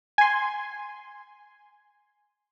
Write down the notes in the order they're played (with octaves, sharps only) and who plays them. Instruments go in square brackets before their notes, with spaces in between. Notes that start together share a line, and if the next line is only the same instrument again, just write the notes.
[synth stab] G#5 C6